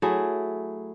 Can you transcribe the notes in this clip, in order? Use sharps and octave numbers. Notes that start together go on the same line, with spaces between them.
F#3 A3 E4 G#4